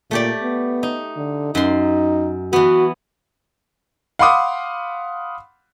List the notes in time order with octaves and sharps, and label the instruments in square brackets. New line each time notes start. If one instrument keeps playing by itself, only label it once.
[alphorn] A#2 [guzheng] A3 G4 D5
[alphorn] B3
[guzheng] D#4
[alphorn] D3
[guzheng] F#2 C6 [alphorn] D#4
[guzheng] E3 B3 [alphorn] F#4
[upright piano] F5 F#5 B5 C6 D6 D#6